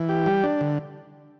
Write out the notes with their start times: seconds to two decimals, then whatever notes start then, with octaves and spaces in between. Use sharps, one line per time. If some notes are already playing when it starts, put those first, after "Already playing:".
Already playing: E3
0.09 G4
0.26 G3
0.43 D4
0.61 D3